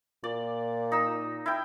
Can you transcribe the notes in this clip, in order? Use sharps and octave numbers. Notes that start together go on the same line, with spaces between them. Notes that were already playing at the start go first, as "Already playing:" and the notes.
A#2 D5
D#4 E6
E4 G5